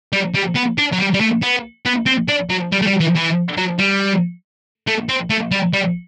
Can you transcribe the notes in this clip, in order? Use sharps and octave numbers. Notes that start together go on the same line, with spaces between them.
G3
G3
B3
D4
F#3
G3
G3
A3
B3
B3
C4
D4
F#3
G3
A3
G3
E3
E3
F#3
G3
A3
C4
A3
G3
G3